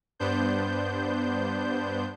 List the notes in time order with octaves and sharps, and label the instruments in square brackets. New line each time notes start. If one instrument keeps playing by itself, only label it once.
[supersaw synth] G2 B3 D4 C5 G6